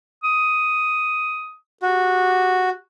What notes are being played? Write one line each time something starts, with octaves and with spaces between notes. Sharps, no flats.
D#6
F#4 G4